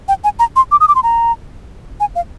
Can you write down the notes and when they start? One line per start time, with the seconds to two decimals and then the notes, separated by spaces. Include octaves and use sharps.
0.08 G5
0.24 G#5
0.39 A#5
0.56 C6
0.72 D6
0.80 D#6
0.88 D6
0.95 C6
1.03 A#5
2.00 G#5
2.15 F5